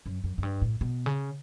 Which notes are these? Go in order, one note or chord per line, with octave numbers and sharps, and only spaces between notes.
F#2
F#2
F#2
G2
A2
B2
C#3